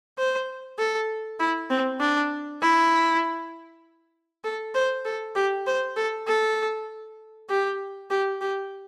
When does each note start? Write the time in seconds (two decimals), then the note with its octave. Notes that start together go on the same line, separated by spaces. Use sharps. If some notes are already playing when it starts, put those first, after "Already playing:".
0.18 C5
0.78 A4
1.39 E4
1.70 C4
2.00 D4
2.61 E4
4.44 A4
4.74 C5
5.05 A4
5.35 G4
5.67 C5
5.96 A4
6.27 A4
7.49 G4
8.10 G4
8.41 G4